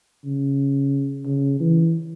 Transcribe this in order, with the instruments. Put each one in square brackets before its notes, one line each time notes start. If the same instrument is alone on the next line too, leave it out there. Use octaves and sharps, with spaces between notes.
[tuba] C#3
C#3
E3